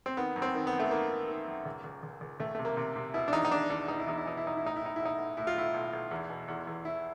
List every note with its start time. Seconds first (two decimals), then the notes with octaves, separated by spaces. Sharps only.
0.06 C4
0.17 D#3 B3
0.36 F#2
0.42 C4
0.55 D#3
0.67 B3
0.73 F#2
0.79 A3
0.91 D#3 A#3
1.10 D#3
1.28 D#3
1.47 F#2
1.65 C#2
1.84 C#2
2.03 C#2
2.21 C#2
2.40 C#2 A3
2.55 C3 A3
2.65 A#3
2.77 C3
2.96 C3
3.14 B2 E4
3.28 D4
3.33 E2 D#4
3.45 D#4
3.51 E2 D4
3.70 E2 D4
3.88 B2 D#4
3.98 E4
4.07 E2 D#4
4.18 E4
4.26 B2 D#4
4.37 E4
4.44 B2 D#4
4.57 E4
4.62 A2 D#4
4.76 E4
4.81 A2 D#4
4.96 B1 E4
5.05 D#4
5.18 B1
5.37 A2 E4
5.47 F4
5.55 B1 E4
5.74 B1
5.93 B1
6.11 E2
6.30 B2
6.48 E2
6.67 E2
6.85 E2 E4